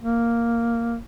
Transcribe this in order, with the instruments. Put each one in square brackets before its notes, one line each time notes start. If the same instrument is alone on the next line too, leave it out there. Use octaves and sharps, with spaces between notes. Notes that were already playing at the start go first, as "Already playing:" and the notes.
[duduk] A#3